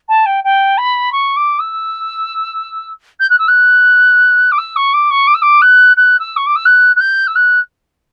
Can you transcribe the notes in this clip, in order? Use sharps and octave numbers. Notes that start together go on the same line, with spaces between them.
A5
G5
G5
B5
C#6
D6
E6
G6
F#6
E6
F#6
D6
E6
C#6
D6
C#6
D6
E6
D6
F#6
F#6
E6
C#6
D6
E6
F#6
F#6
G6
E6
F#6